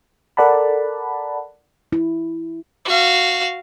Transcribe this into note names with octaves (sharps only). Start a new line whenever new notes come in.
A4 A#4 D5 F#5 A5 B5
E4
F#4 F5